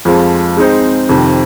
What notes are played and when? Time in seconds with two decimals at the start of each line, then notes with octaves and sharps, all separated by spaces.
0.05 F2 F3 G#3
0.57 G#3 C4 D#4 C5
1.09 F2 C3 D#3